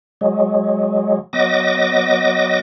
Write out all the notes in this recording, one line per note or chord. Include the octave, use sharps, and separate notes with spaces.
F#3 G#3
F#3 B3 D#5 D6 A#6